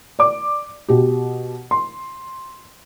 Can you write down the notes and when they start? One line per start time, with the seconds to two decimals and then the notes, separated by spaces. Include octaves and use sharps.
0.19 D5 D6
0.89 B2 G4
1.71 C6